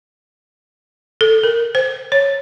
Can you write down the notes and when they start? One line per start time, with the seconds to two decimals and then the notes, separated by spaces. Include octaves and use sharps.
1.21 A4
1.43 A#4
1.75 C5
2.12 C#5